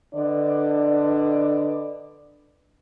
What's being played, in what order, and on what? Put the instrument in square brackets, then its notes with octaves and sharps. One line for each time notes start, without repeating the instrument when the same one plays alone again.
[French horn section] D3 D4 B4 D5 D#5